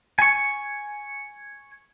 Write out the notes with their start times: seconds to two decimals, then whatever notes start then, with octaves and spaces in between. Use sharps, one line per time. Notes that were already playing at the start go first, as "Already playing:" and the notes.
0.19 G#5 C#6